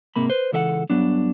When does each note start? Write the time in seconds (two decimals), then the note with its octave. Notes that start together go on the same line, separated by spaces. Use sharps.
0.16 G#2 C3 A#3 B5
0.30 B4 C5
0.52 C#2 E3 A4 E5 F#5
0.90 G2 F#3 B3 D4